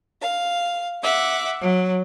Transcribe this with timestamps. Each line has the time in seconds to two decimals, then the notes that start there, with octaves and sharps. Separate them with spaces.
0.21 F5
1.02 E5 F#5 D6
1.60 F#3